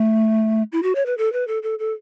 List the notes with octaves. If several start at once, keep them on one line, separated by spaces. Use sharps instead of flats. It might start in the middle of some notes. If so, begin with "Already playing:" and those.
Already playing: A3
E4
F#4
C#5
B4
A4
B4
A4
A4
A4